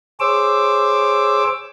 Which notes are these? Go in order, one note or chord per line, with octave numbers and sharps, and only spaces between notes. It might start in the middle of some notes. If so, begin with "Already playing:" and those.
G#4 C5 C#5 D6 E6